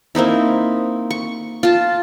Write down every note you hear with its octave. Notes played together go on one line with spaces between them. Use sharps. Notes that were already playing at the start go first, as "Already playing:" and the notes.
A#3 C4 D#4 E4
C#6
F4 A5